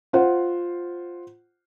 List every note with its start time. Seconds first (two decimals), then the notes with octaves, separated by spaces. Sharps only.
0.13 F4 C5 F#5